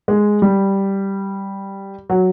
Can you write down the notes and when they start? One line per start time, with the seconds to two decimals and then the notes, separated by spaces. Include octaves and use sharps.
0.08 G#3
0.42 G3
2.09 F#3